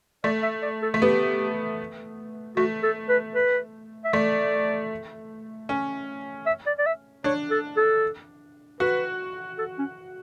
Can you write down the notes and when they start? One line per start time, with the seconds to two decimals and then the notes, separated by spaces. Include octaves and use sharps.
0.24 A3 D5
0.43 E5
0.63 D5
0.82 A4
0.94 A3
1.01 B3 G4
2.57 A3 F#4
2.83 A4
3.09 B4
3.35 B4
4.04 E5
4.13 A3 D5
5.69 C#4
6.46 E5
6.66 D5
6.79 D5
6.86 E5
7.24 D4 C#5
7.51 A4
7.77 A4
8.80 F#4 B4
9.58 A4
9.79 C#4